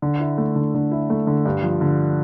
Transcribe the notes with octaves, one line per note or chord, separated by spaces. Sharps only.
D3
E4
A3
D3
D3
E4
A3
D3
G2
F3
D3